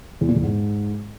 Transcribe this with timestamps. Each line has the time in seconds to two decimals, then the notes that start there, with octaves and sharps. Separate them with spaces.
0.21 E2
0.29 A#2
0.36 E2
0.43 G#2